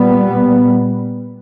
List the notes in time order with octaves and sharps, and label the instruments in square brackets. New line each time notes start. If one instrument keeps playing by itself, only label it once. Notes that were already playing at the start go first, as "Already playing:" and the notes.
Already playing: [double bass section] A#2 G3 B3